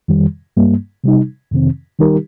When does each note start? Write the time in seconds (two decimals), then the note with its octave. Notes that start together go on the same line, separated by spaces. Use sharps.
0.08 F2 D#3 G3
0.57 G2 G3 A#3
1.04 C3 G3 D#4
1.52 F2 C3 D#3 C4
1.99 D#3 G3 D#4 G4 A#4